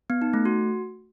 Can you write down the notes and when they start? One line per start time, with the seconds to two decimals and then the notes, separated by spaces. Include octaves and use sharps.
0.10 B3
0.22 D#4
0.34 A3
0.45 F#4